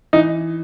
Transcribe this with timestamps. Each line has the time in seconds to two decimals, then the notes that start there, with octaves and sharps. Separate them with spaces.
0.13 E3 D#4